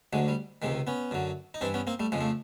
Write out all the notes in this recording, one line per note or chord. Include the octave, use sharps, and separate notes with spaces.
D2 D3 F#3 G#3
G3
C#2 C3 D#3 G#3
B3 C#4
F#2 D3 F#3
D#4
G2 E3 C4 D4
B3 C#4
A#3 C4
G3 A3
F2 C#3 F3 G#3
A3